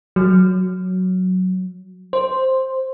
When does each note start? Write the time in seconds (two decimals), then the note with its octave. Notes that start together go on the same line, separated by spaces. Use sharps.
0.16 F#3
2.13 C5